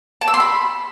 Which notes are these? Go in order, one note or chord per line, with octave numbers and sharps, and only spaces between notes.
A5
E6
C6
B5